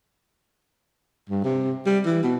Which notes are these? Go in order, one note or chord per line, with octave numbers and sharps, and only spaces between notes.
G2
C3
G3
E3
B2